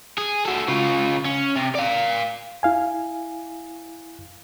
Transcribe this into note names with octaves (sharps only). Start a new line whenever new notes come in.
G#4
F#4 A4
C#3 F4
C#4
C3
D5 F5
E4 F5 G#5